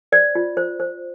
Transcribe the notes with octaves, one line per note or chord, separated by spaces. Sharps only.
C5 D5
F4
C5
C5